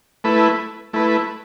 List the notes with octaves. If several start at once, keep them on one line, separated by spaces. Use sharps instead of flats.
A3 E4 B4
A3 E4 B4